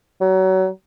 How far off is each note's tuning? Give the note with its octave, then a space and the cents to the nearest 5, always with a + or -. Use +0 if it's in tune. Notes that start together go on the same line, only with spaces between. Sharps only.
F#3 +30